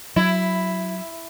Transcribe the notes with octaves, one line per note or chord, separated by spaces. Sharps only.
F#3 E4